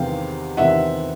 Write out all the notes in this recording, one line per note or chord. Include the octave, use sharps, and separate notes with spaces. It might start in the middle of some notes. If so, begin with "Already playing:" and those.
Already playing: E2 C3 D#3 G#3 C4 F5 G5
E2 C3 D#3 G#3 C4 E5 F#5